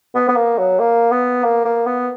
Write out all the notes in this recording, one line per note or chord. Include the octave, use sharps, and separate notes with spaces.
B3
B3
A#3
F#3
A#3
B3
A#3
A#3
B3